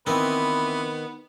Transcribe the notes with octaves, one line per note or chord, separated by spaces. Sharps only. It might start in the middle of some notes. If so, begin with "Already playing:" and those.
D#3 E3 B3 C4 B4